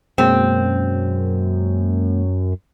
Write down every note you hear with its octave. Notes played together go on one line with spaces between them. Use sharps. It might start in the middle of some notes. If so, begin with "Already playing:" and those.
F#2 B2 G#3 A#3 C4